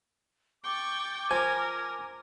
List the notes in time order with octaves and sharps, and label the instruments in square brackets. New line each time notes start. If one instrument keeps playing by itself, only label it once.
[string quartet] G5 C#6 A6 [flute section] D6
[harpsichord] F3 [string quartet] A#4 [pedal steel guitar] G#5